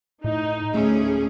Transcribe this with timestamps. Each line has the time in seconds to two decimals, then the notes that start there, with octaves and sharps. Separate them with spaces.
0.24 A2 D#4
0.74 D2 A2 A3 C#4 G#4